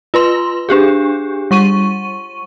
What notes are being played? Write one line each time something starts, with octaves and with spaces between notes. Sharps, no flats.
F4 B4 C6
D4 G4 G#4
G3 C#6 D#7